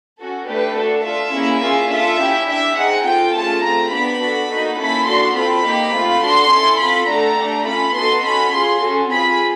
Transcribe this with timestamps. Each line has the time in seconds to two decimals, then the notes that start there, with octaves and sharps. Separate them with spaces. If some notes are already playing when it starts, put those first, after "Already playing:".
0.18 C#4 F#4 A4
0.47 A3 D4 G4 B4
0.77 D4 F#4 A4
1.05 D4 F4 A4 E5
1.34 A#3 C#4 E4 G#4
1.63 C#4 F4 G#4
1.91 D4 F4 A4 E5
2.20 C#4 E4 G4
2.48 D4 G4 E5
2.77 C4 D#4 G#4 F#5
3.06 C4 F4 A4 G5
3.35 A3 C#4 F4 G#4 A5
3.64 A3 C4 F4 A#5
3.92 B3 D4 G4 B5
4.21 D4 F#4 A4
4.50 A#3 D#4 F#4 A4
4.78 A#3 C#4 E4 A4 B5
5.08 D4 F#4 A4 C6
5.36 C4 F4 A4 B5
5.65 A#3 D#4 G4
5.94 A3 C4 F4
6.22 D4 F#4 A4 C6
6.51 C#4 E4 A4
6.80 C4 F4 A4 B5
7.08 A3 D4 F#4 A4 A#5
7.38 A3 D4 G4
7.66 C#4 F4 A4 B5
7.95 B3 D#4 F#4 A4 C6
8.24 C#4 F#4 A4 B5
8.53 C#4 F4 G#4 C6
8.81 C#4 F#4 A4
9.10 C4 F4 G#4 B5